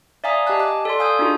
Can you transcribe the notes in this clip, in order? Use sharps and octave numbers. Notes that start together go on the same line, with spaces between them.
D5 E5 F5 G#5 A#5 D#6
G4 D#5 G#5 A5 F#6
D6 F#6
A4 D5 C6
F5 G#5 D#6 E6 G6
D4 D#4 F4 F#4 G#4